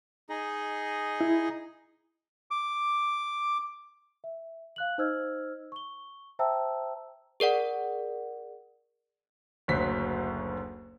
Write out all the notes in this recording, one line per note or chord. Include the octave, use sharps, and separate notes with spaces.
D#4 G#4 D#5
E4
D6
E5
F5 F#6 F#7
D#4 C5 D#5 E6 F6 G#6
C#6 G7
C5 E5 G5 A5 A#5 E6
G#4 A#4 D5 F#5
F#1 D2 F#3 C5 B6